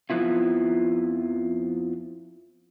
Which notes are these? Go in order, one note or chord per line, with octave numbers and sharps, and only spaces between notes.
F2 B2 F3 B3 E4 F4